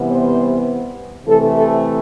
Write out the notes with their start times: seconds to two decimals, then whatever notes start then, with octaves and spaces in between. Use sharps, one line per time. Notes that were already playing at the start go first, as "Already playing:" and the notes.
Already playing: C3 E3 G3 B3
0.10 C5
1.26 C3 E3 A3 A4
1.55 A4